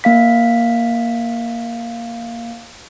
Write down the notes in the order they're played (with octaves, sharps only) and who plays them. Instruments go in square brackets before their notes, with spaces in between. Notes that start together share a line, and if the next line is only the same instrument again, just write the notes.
[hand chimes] A#3 F5 B6